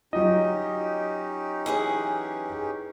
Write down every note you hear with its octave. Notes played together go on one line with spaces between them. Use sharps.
F#3 C#4 D#4 F4 G4 D#5
E3 G#4 F#5